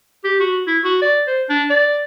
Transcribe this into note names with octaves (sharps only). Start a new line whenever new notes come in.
G4
F#4
E4
F#4
D5
C5
D4
D5